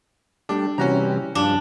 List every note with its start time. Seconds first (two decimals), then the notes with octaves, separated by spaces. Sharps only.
0.49 G3 A3 D4
0.78 C3 E3 G3 C#4 F#4 A#5
1.35 G2 F3 D4